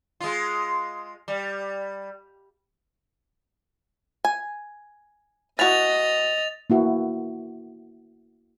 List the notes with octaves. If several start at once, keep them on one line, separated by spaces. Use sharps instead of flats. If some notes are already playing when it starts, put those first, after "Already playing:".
G#3 F4
G3
G#5
E3 F#4 D#5 A6 F7
A#3 E4 F#4